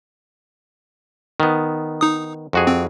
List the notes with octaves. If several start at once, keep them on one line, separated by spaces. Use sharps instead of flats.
D#3 B3
D#4 D#6
F2 F#4 G#4
C4